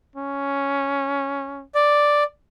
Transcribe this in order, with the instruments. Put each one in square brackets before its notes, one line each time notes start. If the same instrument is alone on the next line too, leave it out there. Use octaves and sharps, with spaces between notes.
[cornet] C#4
[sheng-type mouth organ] D5